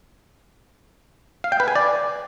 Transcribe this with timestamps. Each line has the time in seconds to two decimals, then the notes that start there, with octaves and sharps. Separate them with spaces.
1.44 F5
1.52 G5
1.60 B4
1.68 G#5
1.76 D5